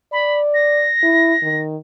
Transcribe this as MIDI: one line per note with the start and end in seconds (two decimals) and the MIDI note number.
0.12 0.88 74
0.12 0.39 83
0.54 1.60 94
1.03 1.34 64
1.42 1.77 51